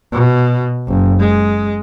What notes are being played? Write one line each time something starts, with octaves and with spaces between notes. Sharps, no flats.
B2
F#1
G#3